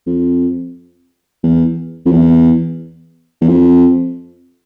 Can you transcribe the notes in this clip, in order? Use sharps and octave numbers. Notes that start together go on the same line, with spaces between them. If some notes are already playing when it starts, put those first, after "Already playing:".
F2
E2
F2
E2
E2
F2